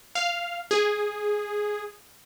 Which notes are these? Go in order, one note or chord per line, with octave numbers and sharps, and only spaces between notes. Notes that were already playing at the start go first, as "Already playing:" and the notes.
F5
G#4